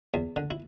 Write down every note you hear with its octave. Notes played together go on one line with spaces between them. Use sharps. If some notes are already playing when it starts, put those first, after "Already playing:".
E2
D3
E4